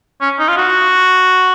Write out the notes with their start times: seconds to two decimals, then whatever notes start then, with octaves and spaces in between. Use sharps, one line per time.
0.21 C#4
0.39 D#4
0.48 F4
0.57 F#4